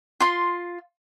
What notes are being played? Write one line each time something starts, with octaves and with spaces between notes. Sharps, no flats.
F4 C6